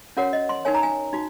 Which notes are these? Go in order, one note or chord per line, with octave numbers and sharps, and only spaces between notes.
C#4 F#4 A#4 C#5 F#5
D#5
C6
D#4 A#4 C#5 G#5
A#5
G#5
D#4 F#4